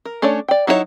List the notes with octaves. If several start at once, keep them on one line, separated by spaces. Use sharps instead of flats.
A#4
A3 C#4 D4 C#5 D5
D5 G5
F#3 D#4 E4 F#4 C#5